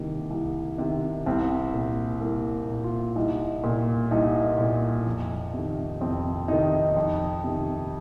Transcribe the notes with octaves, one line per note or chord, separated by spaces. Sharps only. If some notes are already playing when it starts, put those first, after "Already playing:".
Already playing: C2 C3 D#3 A#3
C2
C3 D#3
C2 C4
A#2
C2 A#3
A#2
F4
C2 D#4
A#2
C2 D#4
A#2
F2
C3 D#3
F2 C4
C3 D#3 D#4
F2
C3 D#3